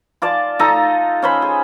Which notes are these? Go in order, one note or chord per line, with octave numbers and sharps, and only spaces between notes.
F4 D5 A5
D#4 F4 A4 A#5
C#4 C5 B5
G#4